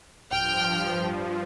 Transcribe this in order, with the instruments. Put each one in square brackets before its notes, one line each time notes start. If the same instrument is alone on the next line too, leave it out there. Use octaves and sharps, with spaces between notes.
[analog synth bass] D1 [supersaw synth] G2 F3 [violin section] G5 F6